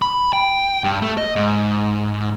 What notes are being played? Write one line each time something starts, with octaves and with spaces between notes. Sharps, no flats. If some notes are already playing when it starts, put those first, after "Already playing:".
B5
G5
G2
A3
D#5
G#2